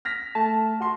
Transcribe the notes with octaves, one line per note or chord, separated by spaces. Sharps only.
F6 A#6 B6
A3 A5
F#4 C6